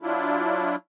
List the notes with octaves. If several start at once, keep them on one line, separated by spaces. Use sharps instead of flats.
F#3 D4 E4 F4